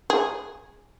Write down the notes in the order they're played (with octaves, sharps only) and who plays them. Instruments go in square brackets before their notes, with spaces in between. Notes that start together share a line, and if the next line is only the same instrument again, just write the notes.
[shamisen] G#4